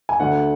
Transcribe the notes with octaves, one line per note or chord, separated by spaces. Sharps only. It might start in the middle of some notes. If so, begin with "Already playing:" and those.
G#5
D2 D3 F#5